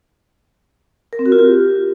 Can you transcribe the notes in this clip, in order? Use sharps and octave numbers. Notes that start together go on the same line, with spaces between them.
A#4
C4
F#4
F4
G4